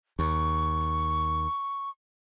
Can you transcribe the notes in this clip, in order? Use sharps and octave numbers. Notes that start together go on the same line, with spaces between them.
D#2 C#6